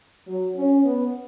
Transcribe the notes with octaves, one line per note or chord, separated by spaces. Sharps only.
F#3
C#4
B3